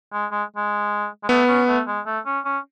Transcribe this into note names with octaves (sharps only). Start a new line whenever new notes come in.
G#3
G#3
G#3
G#3
A3 B3
C#4
A3
G#3
A3
C#4
C#4